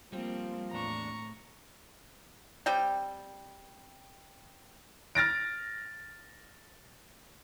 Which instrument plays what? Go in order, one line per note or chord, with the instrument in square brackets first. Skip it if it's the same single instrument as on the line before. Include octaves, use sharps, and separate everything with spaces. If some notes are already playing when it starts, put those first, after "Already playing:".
[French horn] F3 [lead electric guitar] G3 [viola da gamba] A#3 C4
[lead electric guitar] E2 D4 [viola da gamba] A2 [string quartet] A#5 C#6
[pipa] G3 C4 G5
[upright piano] F6 A6 A#6 D7